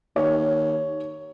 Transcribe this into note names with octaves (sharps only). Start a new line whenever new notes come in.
D#2 C#5